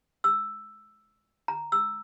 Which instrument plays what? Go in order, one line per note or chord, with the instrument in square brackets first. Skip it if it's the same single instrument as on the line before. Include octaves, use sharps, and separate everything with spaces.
[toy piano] E6
A#5
E6